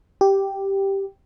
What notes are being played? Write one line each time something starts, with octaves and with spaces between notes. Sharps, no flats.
G4